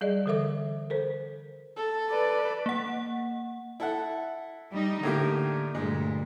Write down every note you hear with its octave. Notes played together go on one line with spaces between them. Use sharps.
G3 G#4 D5 D#5
D3 E3 A4 A#4 E5 D6
A4 A#4 C5
A4
B4 D5
A#3 F#5
E4 A4 F#5
G3 D#4
A2 D3 A#3 G4
D2 G2 A#2 G#3